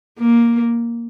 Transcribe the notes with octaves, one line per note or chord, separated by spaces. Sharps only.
A#3